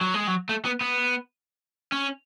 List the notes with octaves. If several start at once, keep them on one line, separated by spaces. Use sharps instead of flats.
F#3
G#3
F#3
A3
B3
B3
C#4